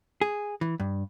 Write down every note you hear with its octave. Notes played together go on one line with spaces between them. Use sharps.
G#4
E3
G2